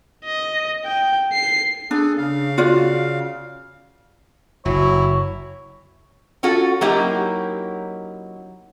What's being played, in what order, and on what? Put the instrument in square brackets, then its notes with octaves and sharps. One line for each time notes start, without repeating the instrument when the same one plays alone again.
[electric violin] D#5
G5
C7
[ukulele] D4 [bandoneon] G#4 A4
[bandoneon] C#3 F5
[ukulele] F4 F#4 D5
[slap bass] F#1 [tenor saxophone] F#3 [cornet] E4 [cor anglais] C#5
[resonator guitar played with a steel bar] C#4 F4 F#4 A4
F#3 A#3 C#4 D#4 E4 G4